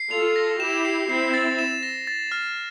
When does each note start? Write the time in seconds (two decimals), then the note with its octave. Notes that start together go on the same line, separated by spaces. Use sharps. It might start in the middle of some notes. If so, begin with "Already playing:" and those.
Already playing: C7
0.11 F4 A4 F7
0.36 A#6
0.60 E4 G4 E7
0.85 C7
1.09 C4 E4 C7
1.34 A6
1.59 E7
1.83 A#6
2.07 A6
2.32 F6